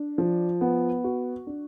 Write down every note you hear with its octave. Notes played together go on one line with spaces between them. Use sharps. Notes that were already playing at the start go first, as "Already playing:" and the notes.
Already playing: D4
F3
B3
F#4
D4